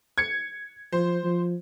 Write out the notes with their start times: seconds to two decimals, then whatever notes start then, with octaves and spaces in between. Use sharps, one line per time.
0.18 G#6 C#7
0.93 F3 C5
1.24 F3